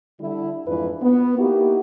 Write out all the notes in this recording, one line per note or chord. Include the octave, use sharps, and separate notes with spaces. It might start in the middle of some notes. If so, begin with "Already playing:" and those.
D3 G3 E4
F2 G#2 E3 D4 F4 B4
B3
A#3 D#4 E4 F#4 G4